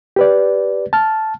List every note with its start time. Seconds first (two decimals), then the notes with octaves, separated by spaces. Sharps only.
0.16 G4 B4 D5
0.93 A5 F6